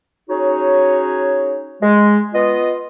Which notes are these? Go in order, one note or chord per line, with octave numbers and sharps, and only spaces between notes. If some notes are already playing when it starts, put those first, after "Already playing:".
C#4 D#4 F#4 G#4 C#5
G#3
B3 F4 D#5